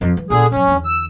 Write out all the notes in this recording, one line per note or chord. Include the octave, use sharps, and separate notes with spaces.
F2 D#4
E3
A#2 D3 B3 G#4
G1 F#2 C#4
E2 D3
E6